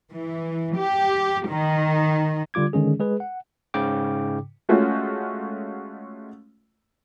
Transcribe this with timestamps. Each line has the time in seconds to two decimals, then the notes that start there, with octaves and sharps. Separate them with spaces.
0.12 E3
0.76 G4
1.48 D#3
2.54 D3 G3 F4 D6 G#6
2.73 D3 D#3 G#3 C#4 G#4
3.00 G#3 G#4 B4
3.20 F#5
3.74 G#2 C#3 G5 D6
4.69 G#3 A3 C#4 F4 F#4